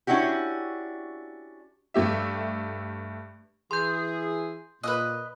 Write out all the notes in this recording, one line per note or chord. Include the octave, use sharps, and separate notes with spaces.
C#4 D4 E4 F#4 G4
G2 A3 G4 E5
E3 G#4 C6 G6
A#2 B4 D#5